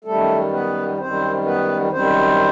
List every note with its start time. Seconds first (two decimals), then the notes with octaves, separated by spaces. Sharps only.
0.04 F#2 D#3 G3 A3 A4
0.52 B3 B4
0.98 F#2 D#3 G3 C4 C5
1.44 B3 B4
1.91 F#2 D#3 G3 C4 C5